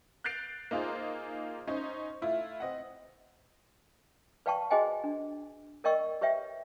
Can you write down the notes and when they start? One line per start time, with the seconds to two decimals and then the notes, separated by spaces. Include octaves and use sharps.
0.24 F#6 G6 A6 C7 D7 F7
0.71 A#3 D#4 F4 G#4 C5
1.67 C#4 D#4 C5
2.21 A3 E4 F4
2.60 C4 D#5 F#5
4.46 B4 D5 F5 G5 A5 C#6
4.70 F#4 G#4 C5 D#5 G5 G#5
5.04 D4
5.84 A#4 D5 D#5 G5 C#6 E6
6.21 G4 B4 C#5 E5 G5